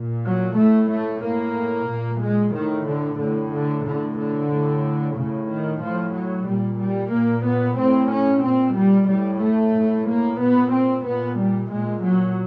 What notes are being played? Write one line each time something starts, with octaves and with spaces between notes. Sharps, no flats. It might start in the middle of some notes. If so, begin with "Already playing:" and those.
Already playing: A#2
F#3
A2 A3
A3
A2 A#3
A#2
G#3
A2 D#3
D3
A2 D3
D3
A2 D3
D3
A2
A2 C#3
D#3
A2 F3
F#3
A#2 G3
G3
A#2 A#3
B3
A2 C4
C#4
A#2 C4
G3
A2 G3
A3
A2
A#3
A#2 B3
C4
A#2 B3
G3
A#2 G#3
F#3